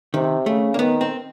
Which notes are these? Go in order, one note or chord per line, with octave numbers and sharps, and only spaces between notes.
C3 D#3
C#3 A3
A#3
D#3 B3
C4